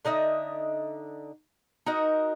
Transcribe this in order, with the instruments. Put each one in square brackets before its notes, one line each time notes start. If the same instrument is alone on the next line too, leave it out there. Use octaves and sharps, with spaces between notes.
[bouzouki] D3 D#4 D#5 E5
D#4 F#4 A#4 D#5